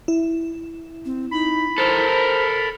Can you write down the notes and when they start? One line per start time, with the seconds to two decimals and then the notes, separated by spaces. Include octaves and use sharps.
0.08 E4
1.05 C4
1.31 D#4 B5
1.78 A4 A#4 C5